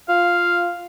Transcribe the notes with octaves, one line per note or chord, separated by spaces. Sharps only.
F4 F5